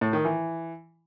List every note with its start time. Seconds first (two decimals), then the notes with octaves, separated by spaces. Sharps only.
0.01 A2
0.13 D#3
0.25 E3